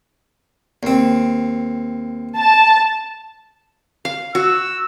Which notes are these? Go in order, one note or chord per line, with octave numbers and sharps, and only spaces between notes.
D#2 C4
A5
F5
F#4 E6